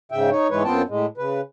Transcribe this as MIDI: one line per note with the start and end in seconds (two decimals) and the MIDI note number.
0.12 0.30 44
0.12 0.30 49
0.12 0.30 76
0.12 0.30 79
0.31 0.48 63
0.31 0.48 73
0.50 0.63 44
0.50 0.63 52
0.50 0.63 56
0.50 0.63 71
0.50 0.63 73
0.65 0.82 42
0.65 0.82 59
0.65 0.82 60
0.65 0.82 65
0.65 0.82 79
0.65 0.82 81
0.89 1.06 45
0.89 1.06 56
1.17 1.41 49
1.17 1.41 71